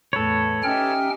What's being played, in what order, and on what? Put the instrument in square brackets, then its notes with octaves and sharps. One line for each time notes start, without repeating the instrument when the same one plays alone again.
[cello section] E2 A2 [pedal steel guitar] A4 B4 C#5
[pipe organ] C#4 G5 F6 [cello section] D#4 G4 E5